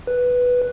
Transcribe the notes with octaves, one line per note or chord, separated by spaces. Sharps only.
B4